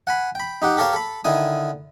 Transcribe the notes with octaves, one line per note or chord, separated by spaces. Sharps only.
F#5 G#5 B5
G5 B5
D#4 G4 F#5 G5
G4 A4 A#4 C#5 F5 A5
A4 B5
D3 D#3 E4 G#5 D#6